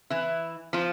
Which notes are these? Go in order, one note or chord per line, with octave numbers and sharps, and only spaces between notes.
E3 E4
F3 F4